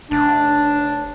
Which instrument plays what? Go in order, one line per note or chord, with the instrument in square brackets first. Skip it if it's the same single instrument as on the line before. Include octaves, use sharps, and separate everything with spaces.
[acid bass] F1 [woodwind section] D4